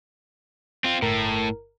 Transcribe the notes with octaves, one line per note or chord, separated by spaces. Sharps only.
C4 F4
G1 A2 A#4